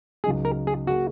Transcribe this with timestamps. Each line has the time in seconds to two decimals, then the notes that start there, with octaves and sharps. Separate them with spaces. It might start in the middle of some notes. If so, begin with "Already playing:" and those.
0.24 C#2 C#3 F#3 D#4 G#4
0.45 A#4
0.67 G#4
0.87 C#3 A#3 C#4 F#4 G#4